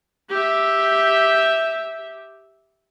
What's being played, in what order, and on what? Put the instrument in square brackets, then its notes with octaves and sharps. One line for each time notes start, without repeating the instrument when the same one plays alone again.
[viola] G4 E5